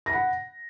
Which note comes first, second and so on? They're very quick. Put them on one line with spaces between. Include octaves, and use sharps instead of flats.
A#6 B5 F#5